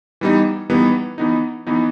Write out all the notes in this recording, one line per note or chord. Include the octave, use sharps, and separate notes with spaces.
E3 G3 B3 D#4
E3 G3 B3 D#4
E3 B3 D#4
E3 B3 D#4